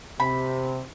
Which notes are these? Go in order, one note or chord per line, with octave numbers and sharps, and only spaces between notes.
C3 B5